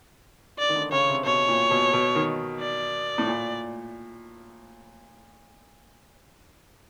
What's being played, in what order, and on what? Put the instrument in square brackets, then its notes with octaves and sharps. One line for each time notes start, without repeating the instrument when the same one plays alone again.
[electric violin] D5
[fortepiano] D#3
D3
[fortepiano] C#3 [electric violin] C#5
[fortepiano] C3
[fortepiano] B2 [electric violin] C#5
[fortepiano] A#2
B2
B2
D#3
[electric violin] D5
[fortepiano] A2
A#2